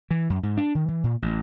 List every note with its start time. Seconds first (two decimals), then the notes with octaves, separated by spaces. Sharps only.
0.11 E3
0.30 F#2
0.43 G#2
0.57 D4
0.75 D#3
0.88 E3
1.04 A#2
1.22 A1